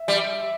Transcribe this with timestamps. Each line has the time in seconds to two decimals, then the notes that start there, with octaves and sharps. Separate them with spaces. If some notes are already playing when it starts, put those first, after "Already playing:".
Already playing: E5
0.08 G3